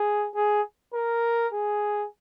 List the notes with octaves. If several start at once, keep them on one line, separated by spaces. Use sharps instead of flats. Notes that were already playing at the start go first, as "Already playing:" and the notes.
Already playing: G#4
G#4
A#4
G#4